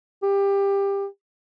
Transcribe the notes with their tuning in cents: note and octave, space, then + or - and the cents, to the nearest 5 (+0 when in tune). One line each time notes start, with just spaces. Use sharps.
G4 +20